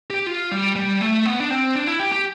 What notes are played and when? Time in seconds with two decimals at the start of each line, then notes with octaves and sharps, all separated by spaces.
0.10 G4
0.27 F4
0.51 G3
0.76 G3
1.01 A3
1.25 B3
1.40 D4
1.50 C4
1.75 D4
1.87 E4
2.00 G4
2.12 G4